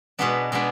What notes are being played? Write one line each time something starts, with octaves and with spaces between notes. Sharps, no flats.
B2 G#3 B3 D4
B2 G#3 B3 D4